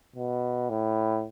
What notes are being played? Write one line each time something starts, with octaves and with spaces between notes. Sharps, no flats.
B2
A2